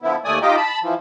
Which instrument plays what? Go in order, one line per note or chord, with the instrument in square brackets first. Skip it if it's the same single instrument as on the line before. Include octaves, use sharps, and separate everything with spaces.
[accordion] D3 F3 B3 E4
D#2 A3 D5 G#5 D#6
D#4 F4 G4 D#5 G5 D6
A5 B5
E3 F3